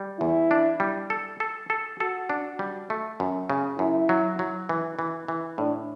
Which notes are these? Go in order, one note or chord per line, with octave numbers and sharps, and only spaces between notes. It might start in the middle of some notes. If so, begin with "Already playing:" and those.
Already playing: G3
E2 E4
D4
G3
A4
A4
A4
F#4 A4
D4
G3
A3
F#2
C#3
F#2 E4
F#3
F#3
E3
E3
E3
A2 D4